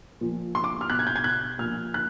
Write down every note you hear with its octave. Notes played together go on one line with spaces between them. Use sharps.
A#2 F3
C6
D6
F6
B2 F#6
G#6
G6
G#6
F#6
A#2 F3 F6
F#6